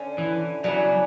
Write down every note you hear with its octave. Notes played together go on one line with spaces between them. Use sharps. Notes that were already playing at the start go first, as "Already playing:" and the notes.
Already playing: D3 A3 C#4
E3
C#3 E3 F#3 B3 D4